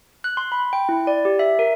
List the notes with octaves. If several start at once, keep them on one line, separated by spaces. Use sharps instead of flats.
F#6
C6
B5
G5
E4
D5
G4
E5
A#4